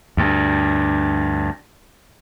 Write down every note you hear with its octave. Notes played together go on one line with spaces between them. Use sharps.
D2 G2